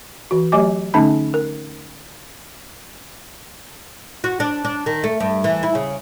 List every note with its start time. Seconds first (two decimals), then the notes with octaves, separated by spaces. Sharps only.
0.31 E3 F#4
0.52 F#3 A3 G4 D#5 G#5 D6
0.94 D3 A3 C#4 D#4 A5 B5
1.34 A#4
4.24 F#4
4.40 D4
4.65 D4
4.86 D#3
5.04 A3
5.20 G2
5.44 E3
5.63 E4
5.75 C#3